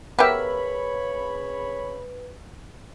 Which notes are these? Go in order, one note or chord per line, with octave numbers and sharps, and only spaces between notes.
C#3 B3 G4 A#4 B4 C#5 E5 B5